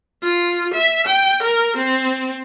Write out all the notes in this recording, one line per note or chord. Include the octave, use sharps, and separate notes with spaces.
F4
E5
G5
A#4
C4